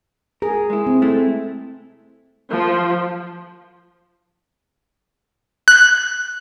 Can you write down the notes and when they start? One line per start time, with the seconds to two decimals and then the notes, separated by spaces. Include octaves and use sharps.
0.42 G#4 A#4
0.70 G#3 E4
0.87 C4
1.02 G#3 A3 E4
2.51 F3
5.68 F#6